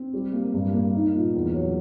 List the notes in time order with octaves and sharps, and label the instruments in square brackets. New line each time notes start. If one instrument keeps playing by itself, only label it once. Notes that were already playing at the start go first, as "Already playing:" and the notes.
Already playing: [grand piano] C4
G3
A#3
G2
A#3
D#4
A#2
E2
F#3